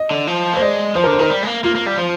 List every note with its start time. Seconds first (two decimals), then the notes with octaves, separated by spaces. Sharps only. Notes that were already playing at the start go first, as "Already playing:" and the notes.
Already playing: D#5
0.11 D3
0.27 F3
0.53 A#3 C5
0.62 G#3 D5
0.95 F3 C5
1.04 A#4
1.07 D3
1.13 C5
1.19 D#3 A#4
1.30 G3
1.43 G#3
1.47 A#3
1.64 A#3 F4
1.75 A#3
1.86 G3
1.98 F3